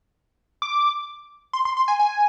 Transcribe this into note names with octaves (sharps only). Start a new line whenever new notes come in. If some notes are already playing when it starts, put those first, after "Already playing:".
D6
C6
C6
C6
G#5
G#5